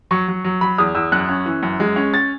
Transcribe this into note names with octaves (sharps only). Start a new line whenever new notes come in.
F#3 C#6
F#3
F#3
F#3 B5
E2 D#6
E2 E6
F#2 F#6
C#4
E3
F#2
G#3
C#4
A6